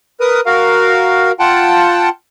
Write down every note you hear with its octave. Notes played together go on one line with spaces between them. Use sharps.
A#4 B4 D#6
F#4 A#4 F5
F4 F#5 G5 A5